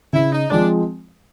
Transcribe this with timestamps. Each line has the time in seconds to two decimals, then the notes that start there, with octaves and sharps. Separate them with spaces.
0.13 C#3 E4
0.32 D#4
0.50 F3 G#3 C4 D4